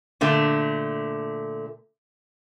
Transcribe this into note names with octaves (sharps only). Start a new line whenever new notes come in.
A#2 D3 A3